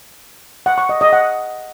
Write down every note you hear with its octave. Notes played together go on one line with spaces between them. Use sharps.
F#5
C#6
D#5
D#5
F#5